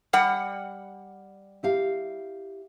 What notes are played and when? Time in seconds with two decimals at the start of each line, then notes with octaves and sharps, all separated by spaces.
0.13 G3 F#5
1.63 E4 G4 F5